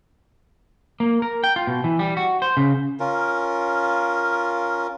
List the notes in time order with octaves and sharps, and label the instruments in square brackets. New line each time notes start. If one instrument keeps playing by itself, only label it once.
[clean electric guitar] A#3
A#4
G5
F4
B2
E3
G3
F#4
C5
C#3
[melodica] C#4 F4 A#4